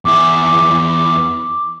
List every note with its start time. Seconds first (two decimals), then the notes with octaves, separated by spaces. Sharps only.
0.05 E2 E4 D6